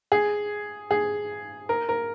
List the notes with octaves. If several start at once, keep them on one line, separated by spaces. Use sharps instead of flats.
G#4
G#4
A#4
A#4